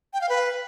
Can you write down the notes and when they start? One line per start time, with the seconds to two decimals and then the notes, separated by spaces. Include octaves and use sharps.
0.13 G5
0.21 F5
0.29 B4